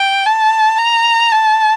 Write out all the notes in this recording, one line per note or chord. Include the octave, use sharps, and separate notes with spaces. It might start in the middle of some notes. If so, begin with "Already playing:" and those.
Already playing: G5
A5
A#5
A5